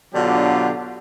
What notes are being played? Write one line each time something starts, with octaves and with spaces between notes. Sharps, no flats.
B2 D3 F#3 D4 F4 G4